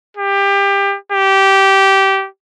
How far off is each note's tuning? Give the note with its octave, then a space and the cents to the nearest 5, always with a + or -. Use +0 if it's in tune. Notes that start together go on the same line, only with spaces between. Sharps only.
G4 +25
G4 -15